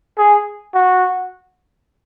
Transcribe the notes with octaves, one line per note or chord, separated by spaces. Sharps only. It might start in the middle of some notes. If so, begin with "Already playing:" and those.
G#4
F#4